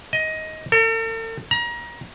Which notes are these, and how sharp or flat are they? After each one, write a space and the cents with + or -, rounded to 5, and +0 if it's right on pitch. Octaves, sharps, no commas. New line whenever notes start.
D#5 +15
A4 +45
A#5 +30